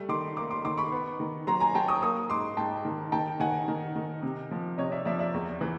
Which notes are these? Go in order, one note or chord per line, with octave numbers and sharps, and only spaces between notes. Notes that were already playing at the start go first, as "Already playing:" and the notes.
Already playing: G3 A3
D#3 C6 D6
A#3 C6 D6
C6 D6
D#3 C6 D6
B5 C#6
B3
D#3
F#3 A#5 C6
G#5 A#5
F#3 G5 A5
C#6 D#6
A#3 C#6 D#6
G#2 C6 D6
G#2 G5 A5
D#3
D#3 G5 A5
D#3 F#5 G#5
D#3
D#3
C3
F3
C3 C#5 D#5
D5 E5
F3 D5 E5
D5 E5
E2
E3